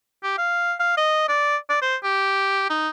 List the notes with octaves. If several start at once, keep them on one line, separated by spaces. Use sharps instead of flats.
G4
F5
F5
D#5
D5
D5
C5
G4
D#4